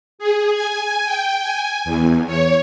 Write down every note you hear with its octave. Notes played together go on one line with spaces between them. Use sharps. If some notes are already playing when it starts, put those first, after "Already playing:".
G#4
G#5
G5
G#5
E2
C#5